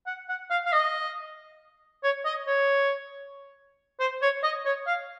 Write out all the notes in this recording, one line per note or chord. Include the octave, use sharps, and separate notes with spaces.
F#5
F#5
F5
F5
D#5
C#5
D#5
C#5
C5
C#5
D#5
C#5
F5